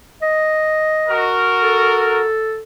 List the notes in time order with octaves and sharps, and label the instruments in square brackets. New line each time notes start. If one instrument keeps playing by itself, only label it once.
[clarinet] D#5
[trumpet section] F#4 A#4
[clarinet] A4